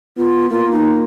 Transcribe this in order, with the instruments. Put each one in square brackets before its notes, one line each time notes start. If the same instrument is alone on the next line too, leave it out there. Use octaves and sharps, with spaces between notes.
[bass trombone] B3 [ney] F4
[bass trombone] A#3 [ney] F4
[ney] D#4